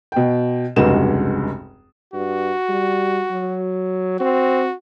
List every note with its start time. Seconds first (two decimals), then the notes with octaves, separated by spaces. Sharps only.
0.12 B2 G5
0.76 F1 C#2 G2 G#3 F#4 E7
2.14 G2 F#4
2.69 G3
3.30 F#3
4.20 C4 F#4